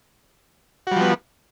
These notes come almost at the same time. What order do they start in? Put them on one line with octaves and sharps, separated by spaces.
F#4 G3 F3 B3